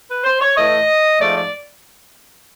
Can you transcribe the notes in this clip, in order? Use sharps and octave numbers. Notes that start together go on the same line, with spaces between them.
B4
C5
C#5
A2 E3 A3 D#5
G#2 F3 A3 D5
D5